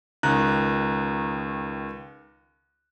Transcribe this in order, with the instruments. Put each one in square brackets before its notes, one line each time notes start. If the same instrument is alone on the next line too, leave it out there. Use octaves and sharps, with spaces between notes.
[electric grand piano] C#2 D#3 A#5 F#6